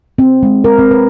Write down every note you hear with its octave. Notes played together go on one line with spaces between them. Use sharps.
C4
G#3
A#4
C4
B4